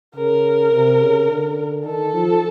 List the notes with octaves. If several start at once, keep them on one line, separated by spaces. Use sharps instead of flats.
C#3 A#4
C3
C#3
D3
D#3 A4
F3